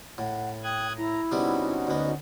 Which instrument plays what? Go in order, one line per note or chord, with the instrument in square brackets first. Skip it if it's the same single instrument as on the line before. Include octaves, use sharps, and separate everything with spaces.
[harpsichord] A2 [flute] F#5
[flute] G5 [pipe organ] D#6 F#6 G#6
[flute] E4 [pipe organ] A#5
[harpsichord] C3 G3 B3 [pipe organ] C#4 D#4 F#4
[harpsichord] D2 B3 [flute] D#5